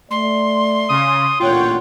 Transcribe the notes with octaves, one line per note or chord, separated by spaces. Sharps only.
A3 D5 C6
C#3 D#6
A1 D2 A#2 F4 C#5 F#5 G5